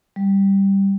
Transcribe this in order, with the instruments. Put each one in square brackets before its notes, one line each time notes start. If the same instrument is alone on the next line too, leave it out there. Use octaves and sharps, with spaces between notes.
[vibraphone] G3